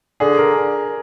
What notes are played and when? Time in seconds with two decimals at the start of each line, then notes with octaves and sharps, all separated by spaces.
0.20 D3 G#4
0.37 A#4